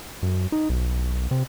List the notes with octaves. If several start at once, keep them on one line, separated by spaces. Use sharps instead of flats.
F#2
D#4
B1
C3